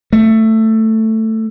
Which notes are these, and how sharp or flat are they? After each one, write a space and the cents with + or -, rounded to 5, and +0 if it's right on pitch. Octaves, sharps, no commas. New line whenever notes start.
A3 +10